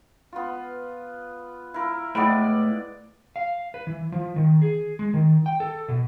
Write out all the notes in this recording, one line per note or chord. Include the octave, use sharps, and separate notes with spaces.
B3 F4
E4 A#4 F5
A2 G#3 B3 D5 G5 B5
F5
B4
E3
F3
D#3
G#4
G#3
D#3
G5
A4
B2